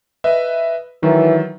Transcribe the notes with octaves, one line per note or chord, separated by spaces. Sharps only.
B4 D#5 E5
D#3 E3 F#3